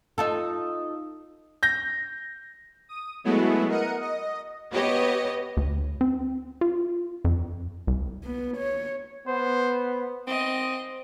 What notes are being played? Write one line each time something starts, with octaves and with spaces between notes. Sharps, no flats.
D#4 F4 A4
G6 A#6
D#6
F#3 G#3 A3 B3 E4 F#4
A#4 D#5 F#5 C#7 D#7
D#5
B3 G4 C#5 D#5
D2
C4
F4
F2
C2
B3
C#5
B3 C5
C4 D#5